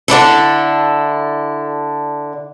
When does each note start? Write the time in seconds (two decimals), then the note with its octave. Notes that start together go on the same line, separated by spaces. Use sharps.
0.08 D3 D4 E4 A4